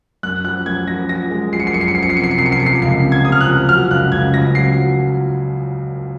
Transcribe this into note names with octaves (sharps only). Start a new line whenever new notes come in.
F#2 F#6
F3 F#6
F#2 G#6
F3 A#6
F3 A#6
G#3
F3 C7
C#7
C7
F#2 C#7
C7
C#7
F3 C7
C#7
C7
C3 C#7
C7
C#7
C3 C7
C#7
C7
F3 C#7
C7
C#2 C7
C3
G#6
C3 D#6
F6
F#6
F3
F#3 F6
C#2 F#6
C#2 G#6
C#2 A#6
F#3 C7
F#3